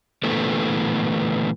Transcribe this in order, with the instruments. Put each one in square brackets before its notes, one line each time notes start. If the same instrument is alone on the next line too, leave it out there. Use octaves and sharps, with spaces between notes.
[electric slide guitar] A#2 D3 E3 A3 B3